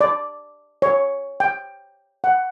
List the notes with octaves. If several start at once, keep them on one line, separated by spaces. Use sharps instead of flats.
D5
C#5
G5
F#5